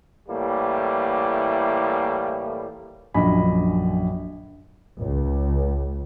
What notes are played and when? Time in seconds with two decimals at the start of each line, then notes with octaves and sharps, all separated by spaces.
0.29 A2 E3 G3 A#3
3.14 A#1 F#2 D3 D#5 G#5 B5
5.00 C#2